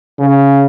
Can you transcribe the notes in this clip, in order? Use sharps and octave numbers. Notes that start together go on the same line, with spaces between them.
C#3